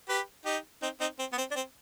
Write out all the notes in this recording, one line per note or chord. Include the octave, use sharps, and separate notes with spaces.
G4 B4
D#4 G4
C4 D#4
C4 D#4
C4
B3
C4
D4
C4